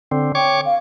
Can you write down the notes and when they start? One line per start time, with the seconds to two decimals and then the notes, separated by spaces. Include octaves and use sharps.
0.12 D3 C4
0.35 C#5 G5 C#6 D6
0.65 F5